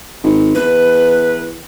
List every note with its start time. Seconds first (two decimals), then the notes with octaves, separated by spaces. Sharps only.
0.24 G#1
0.55 E2 B4